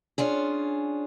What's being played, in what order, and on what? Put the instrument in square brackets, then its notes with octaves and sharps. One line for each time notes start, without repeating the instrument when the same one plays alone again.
[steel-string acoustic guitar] C#4 D4 F4 G#4